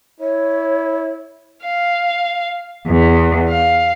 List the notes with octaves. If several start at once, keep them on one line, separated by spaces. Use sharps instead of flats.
E4 C#5
F5
E2
F5